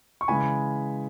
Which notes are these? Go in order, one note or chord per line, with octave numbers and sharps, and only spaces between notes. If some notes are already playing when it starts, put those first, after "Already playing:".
C#6
C#3 E3 G#3 G#5 B5